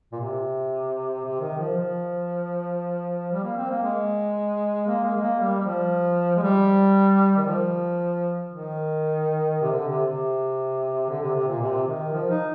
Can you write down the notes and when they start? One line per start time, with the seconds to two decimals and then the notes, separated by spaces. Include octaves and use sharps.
0.13 A#2
0.20 C3
1.25 C3
1.41 D#3
1.58 F3
1.76 F3
3.32 G3
3.44 A#3
3.57 C4
3.70 A#3
3.83 G#3
4.87 A#3
5.04 G#3
5.16 G#3
5.21 A#3
5.40 G3
5.60 G3
5.65 F3
6.36 G#3
6.42 G3
7.37 D#3
7.46 F3
8.50 D#3
9.62 C3
9.72 D3
9.88 C3
10.06 C3
11.10 D3
11.22 C3
11.35 C3
11.48 A#2
11.62 C3
11.87 D#3
12.13 F3
12.30 D#4